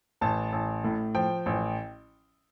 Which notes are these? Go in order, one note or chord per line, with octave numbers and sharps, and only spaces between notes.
A1 A5
A1
A2
F3 G5
A1